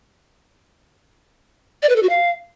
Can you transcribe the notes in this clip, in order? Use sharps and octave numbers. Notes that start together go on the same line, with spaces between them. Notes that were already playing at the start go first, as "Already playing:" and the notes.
D5
B4
A4
F#4
F5